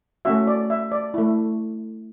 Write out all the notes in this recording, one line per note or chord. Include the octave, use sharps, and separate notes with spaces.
A3 C#4 F#4 E5
D5
E5
D5
A3 E4